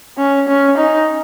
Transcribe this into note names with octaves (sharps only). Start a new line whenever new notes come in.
C#4
C#4
D#4